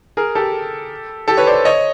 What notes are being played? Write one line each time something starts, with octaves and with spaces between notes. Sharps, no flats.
G#4 A#4
G4 A4
G4 A4
B4 C#5
C5 D5
C#5 D#5